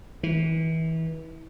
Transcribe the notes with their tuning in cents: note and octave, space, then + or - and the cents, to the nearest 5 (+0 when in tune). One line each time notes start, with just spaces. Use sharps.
E3 -30